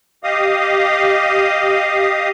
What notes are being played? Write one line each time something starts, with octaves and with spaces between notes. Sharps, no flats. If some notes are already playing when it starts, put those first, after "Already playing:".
G4 D#5 F5 D#6